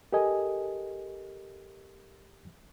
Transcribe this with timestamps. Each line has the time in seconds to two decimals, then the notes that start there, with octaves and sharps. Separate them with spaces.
0.13 G4 A4 A#4 D#5 G#5